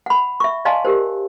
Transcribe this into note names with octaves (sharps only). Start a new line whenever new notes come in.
F#5 B5
E5 C#6
D5 D#5 F5 G#5 A5 C6
G4 A#4 C5